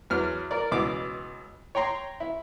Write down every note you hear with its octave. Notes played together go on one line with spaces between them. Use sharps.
E2 F#3 F6
A#4 D5
C#2 B2 E3 D6
C#5 G5 A#5 C6
E4